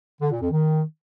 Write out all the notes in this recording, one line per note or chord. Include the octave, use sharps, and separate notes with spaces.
D3
A#2
F2
D#3